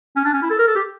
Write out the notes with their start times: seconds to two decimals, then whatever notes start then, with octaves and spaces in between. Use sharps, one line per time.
0.16 C#4
0.25 D4
0.34 C#4
0.42 E4
0.50 A4
0.59 A#4
0.67 A4
0.76 G4